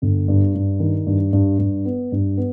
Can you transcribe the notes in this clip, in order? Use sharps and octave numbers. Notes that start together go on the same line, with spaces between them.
G1
G2
G2
D#3
G2
G2
G2
B3
G2
B3